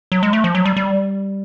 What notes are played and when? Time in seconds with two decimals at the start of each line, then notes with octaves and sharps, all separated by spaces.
0.12 F#3
0.23 G#3
0.33 A3
0.44 F3
0.55 F#3
0.65 G3
0.77 G3